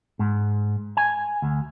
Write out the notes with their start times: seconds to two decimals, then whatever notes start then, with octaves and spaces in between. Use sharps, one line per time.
0.19 G#2
0.97 G#5
1.42 D2